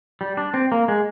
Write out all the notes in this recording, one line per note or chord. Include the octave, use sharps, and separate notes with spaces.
G3
D4
C4
A#3
G#3